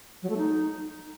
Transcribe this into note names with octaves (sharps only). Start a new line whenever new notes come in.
F#3
A3
D#4